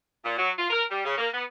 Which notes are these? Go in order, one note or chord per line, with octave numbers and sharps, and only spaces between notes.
A#2
F#3
F4
A#4
G3
C#3
A#3
B3